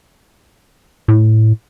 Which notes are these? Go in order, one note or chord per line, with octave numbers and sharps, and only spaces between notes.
A2